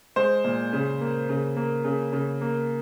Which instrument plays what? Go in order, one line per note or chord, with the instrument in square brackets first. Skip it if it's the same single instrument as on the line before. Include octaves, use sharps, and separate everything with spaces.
[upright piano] G#3 C5
A#2
C#3
A#3
C#3
A#3
C#3
C#3
A#3